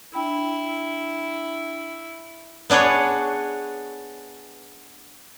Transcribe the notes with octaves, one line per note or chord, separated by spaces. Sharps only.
D4 E4 G5 B5
B3 D4 G#4 B4 C#5